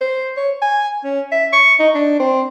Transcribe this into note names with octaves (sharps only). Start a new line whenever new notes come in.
C5
C#5
G#5
C#4
E5
C#6
D#4
D4
C4